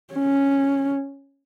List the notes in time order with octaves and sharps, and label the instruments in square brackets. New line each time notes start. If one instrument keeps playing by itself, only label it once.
[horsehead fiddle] C#4